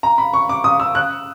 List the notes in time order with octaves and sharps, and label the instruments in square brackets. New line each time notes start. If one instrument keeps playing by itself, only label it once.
[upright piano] A#5
B5
C#6
D6
D#6
E6
F#6